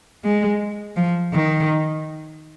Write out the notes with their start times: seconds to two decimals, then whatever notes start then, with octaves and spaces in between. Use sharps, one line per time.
0.24 G#3
0.97 F3
1.33 D#3